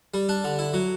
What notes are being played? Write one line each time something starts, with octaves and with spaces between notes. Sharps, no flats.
G3
D4
D3
E4
F#3